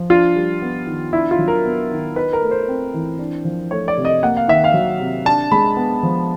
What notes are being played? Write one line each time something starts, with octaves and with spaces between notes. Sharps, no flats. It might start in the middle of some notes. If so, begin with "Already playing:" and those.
Already playing: F3
D4 F4
G3
B3
D#3
D4 E4
F4
F#3
A#4
B3
D#3
D#4 B4
A#4
A3
C5
C4
E3
D4
F3
A3 C#5
D5
C3
D#5
A#3 F#5
F5
D#3 E5
F5
F#3
C3
D4 A5
G#3 B5
B3
F3